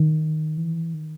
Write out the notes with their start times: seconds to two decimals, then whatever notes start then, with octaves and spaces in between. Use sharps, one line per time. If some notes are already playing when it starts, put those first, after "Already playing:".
Already playing: D#3
0.57 E3
0.94 D#3